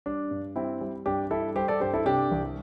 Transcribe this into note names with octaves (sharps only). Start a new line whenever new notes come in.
G3 D4
G2
G3 C4 E4
G3
G2 D4 G4
G3 E4 A4
G3 G4 C5
A4 D5
G2 G4 C5
E4 A4
C3 D4 G4
C2